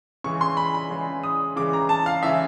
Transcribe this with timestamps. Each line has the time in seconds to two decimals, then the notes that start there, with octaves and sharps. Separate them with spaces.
0.24 C#3 E3 G#3 C#6
0.41 C6
0.57 B5
0.74 B5
0.90 C#3 E3 G#3
1.23 D#6
1.56 C#3 E3 G#3 D6
1.73 A#5
1.89 A5
2.06 F5
2.22 C#3 E3 G#3 E5